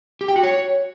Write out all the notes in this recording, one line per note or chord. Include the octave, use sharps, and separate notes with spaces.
G4
G5
F#4
C#5